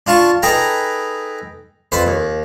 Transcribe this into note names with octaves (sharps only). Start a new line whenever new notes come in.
D4 F4 A5 C#6
D#4 G#4 A4 B4 G5 A#5
F2 B4 C5
D#2